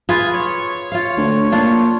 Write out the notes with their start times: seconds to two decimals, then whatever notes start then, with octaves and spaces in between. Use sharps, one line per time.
0.09 F4 G#4 B4 G#6
0.33 C#5
0.92 F4 F5
1.17 D2
1.52 A#2 D4 F4